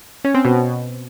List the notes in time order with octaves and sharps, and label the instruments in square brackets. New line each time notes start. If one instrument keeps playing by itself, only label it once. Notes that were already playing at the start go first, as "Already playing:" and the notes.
[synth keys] C#4
C4
B2